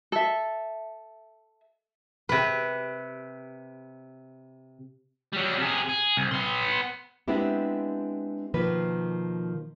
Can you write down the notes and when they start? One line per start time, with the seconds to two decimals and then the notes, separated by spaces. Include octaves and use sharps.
0.12 A4 E5
2.29 C3 B4
5.33 F#3 G3
5.58 C3 G#4
5.89 G#4
6.17 C2
6.31 B3 C6
7.28 G#3 B3 C4 D4 E4 G4
8.54 B2 D#3 F3 A#3 B4